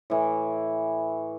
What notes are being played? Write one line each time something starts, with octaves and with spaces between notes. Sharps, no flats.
A2 E3